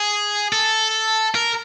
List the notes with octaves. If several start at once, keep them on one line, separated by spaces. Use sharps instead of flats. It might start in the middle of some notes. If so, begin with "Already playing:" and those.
Already playing: G#4
A4
A#4